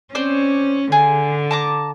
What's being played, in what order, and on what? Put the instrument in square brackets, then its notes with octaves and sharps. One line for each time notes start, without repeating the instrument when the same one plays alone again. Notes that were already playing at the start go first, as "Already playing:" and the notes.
[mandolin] C4 C5 D5 [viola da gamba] C#4
[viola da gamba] D3 [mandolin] G#4
[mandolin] A5 A#5 D6